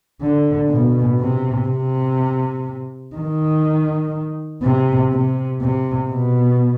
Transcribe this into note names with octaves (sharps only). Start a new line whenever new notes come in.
D3
B2
C3
C3
D#3
C3
C3
C3
B2